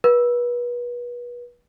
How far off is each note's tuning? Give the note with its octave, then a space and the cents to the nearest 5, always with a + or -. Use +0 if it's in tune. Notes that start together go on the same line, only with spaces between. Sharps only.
B4 -30